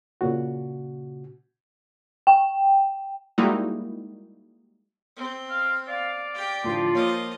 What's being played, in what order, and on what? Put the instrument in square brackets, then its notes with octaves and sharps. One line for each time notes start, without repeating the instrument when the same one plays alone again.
[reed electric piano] A#2 C#3 F#4
[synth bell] G5
[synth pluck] G3 G#3 A#3 D#4 E4 F#4
[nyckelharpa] C4
[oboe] F5
[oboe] D5 [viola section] F5
[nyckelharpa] G4 G5
[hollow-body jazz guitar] A2 D3 E3 [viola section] F3 F4
[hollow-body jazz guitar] A#3 A#4 C#5 [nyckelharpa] D#5 F5